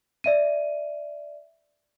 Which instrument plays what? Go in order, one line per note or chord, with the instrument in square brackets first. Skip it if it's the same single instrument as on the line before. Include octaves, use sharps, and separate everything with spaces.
[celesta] D5 E5 D#7